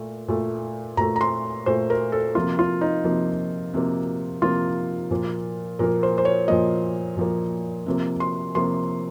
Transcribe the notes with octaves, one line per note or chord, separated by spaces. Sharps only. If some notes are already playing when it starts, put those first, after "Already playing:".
Already playing: A#2 A3
A#2 A3
A#2 A3 A#5
A#5
C6
A#2 A3 C5
A#4
A4
C3 F3 A#3 F4
F4
D#4
C3 F3 A#3
C3 F3 A#3
C3 F3 A#3 F4
A#2 F3 A#3
A#2 F3 A#3 A#4
C5
C5
C#5
A#2 F3 A#3 D#5
A#2 F3 A#3
C3 F3 A#3
C6
C3 F3 A#3 C6